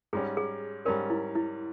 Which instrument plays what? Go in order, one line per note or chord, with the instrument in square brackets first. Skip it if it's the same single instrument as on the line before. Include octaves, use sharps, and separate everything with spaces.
[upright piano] G#2 G3 C#4 [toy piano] G#4
[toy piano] G#4
[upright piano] G#2 G3 C#4 [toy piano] A#4
[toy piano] E4
E4